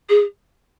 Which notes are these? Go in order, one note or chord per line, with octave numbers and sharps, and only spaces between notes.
G#4